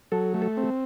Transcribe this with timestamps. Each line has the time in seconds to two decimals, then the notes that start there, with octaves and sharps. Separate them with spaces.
0.12 F#3 A4
0.34 A3
0.42 A4
0.57 C4